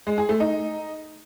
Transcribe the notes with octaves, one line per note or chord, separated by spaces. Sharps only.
G#3
G#4
A3
D#4